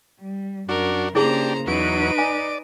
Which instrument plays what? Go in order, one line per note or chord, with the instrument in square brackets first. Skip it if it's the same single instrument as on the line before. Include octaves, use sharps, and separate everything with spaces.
[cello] G3
[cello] F#2 [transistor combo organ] D4 F#4 [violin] A#4
[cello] C#3 A#3 [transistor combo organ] D4 G4 [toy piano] E4 G#4 [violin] C5 A#5
[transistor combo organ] E2 F#3 [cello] D#4 B4 [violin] D7 D#7
[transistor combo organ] D5 [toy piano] G#5